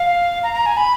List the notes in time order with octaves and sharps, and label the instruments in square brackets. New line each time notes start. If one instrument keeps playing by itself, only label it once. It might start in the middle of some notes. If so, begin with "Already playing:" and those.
Already playing: [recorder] F5
A#5
A#5
G#5
B5